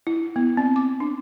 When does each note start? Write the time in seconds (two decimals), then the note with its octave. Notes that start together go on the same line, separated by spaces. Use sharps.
0.07 E4
0.36 B3
0.57 C4
0.76 D6
1.00 D4